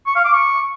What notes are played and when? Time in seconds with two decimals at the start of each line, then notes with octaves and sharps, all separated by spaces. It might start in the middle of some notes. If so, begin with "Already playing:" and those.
0.07 C#6
0.16 F5
0.25 D6
0.34 C#6